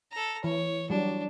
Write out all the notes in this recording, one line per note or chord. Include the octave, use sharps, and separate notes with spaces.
A4 A#5
E3 C#5
F#3 G3 D4